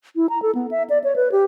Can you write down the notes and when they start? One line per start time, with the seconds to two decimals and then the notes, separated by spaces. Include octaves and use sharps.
0.16 E4
0.29 A#5
0.42 A4
0.55 B3
0.71 E5
0.90 D5
1.04 C#5
1.16 B4
1.32 G4